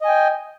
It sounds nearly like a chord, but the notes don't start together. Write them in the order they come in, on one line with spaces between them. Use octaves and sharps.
D#5 G#5 G5